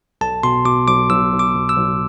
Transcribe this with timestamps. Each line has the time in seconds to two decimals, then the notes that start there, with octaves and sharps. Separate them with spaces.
0.21 B1 A5
0.43 B2 C6
0.65 B2 D6
0.87 B1 D6
1.10 B1 E6
1.32 B1
1.39 D6
1.55 B1
1.69 E6
1.76 B1